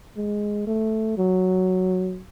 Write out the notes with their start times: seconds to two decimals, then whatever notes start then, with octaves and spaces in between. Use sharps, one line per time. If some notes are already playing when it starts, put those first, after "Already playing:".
0.17 G#3
0.67 A3
1.17 F#3